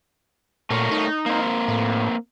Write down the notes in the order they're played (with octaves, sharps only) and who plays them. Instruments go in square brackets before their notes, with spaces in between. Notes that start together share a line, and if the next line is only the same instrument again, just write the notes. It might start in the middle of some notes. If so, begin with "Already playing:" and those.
[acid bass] A#2 [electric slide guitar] A3 A#4 C#5
[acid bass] D#4
[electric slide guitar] A#3 C4
[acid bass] A2